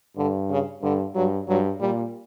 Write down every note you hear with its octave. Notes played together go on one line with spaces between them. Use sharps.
G2 D3
C#3
G2 D3
G2 F#3
G2 F#3
A#2 G3